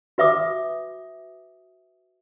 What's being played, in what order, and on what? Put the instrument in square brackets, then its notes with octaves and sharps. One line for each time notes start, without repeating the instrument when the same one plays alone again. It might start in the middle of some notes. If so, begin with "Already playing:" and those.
[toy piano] F#4 B4 E5 D6 D#6